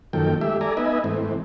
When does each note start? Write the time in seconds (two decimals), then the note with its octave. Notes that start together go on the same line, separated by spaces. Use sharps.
0.13 F#2 D#3 F3 A#3 A4 G5
0.41 G#3 A3 G4 E5
0.61 A4 D5 G#5 A#5
0.77 B3 D#4 B4 D#5 E5 G#5
1.04 G#2 E3 A3 C4